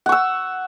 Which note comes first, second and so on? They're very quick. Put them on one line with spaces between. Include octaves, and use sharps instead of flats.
F#5 C#6 E6